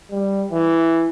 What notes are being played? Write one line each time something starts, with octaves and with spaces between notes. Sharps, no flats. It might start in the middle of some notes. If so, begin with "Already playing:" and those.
G3
E3